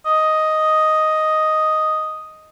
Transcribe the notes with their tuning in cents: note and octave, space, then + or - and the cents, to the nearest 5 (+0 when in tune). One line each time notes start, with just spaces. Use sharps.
D#5 +5